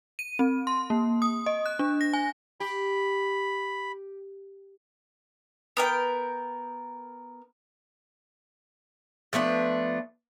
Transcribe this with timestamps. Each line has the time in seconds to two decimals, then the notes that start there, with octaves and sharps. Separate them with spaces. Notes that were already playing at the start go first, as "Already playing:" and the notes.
0.19 D#7
0.39 C4
0.67 C6
0.90 A#3
1.22 D#6
1.46 D#5
1.66 F#6
1.79 D4
2.01 A#6
2.13 G#5
2.60 G4 B5
5.77 B3 A#4 G5
9.33 F3 A3 B3 D4